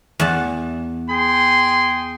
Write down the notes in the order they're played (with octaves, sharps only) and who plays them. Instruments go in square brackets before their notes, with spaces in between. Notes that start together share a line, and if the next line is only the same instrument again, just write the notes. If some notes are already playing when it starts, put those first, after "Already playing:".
[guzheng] E2 F#5 A5
[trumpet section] G#4 G5 C6